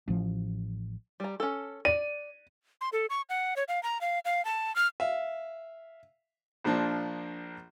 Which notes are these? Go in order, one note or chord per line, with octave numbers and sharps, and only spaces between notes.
A1 F3
G3 A#5
C#4 A4
D5 D#7
C6
A4
C#6
F#5
C#5
F5
A#5
F5
F5
A5
F6
E5 F5
A#1 F3 A#3 D4